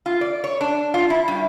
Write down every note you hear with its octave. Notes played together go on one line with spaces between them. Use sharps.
F4
D5
C#5
D4
F4
E4
G2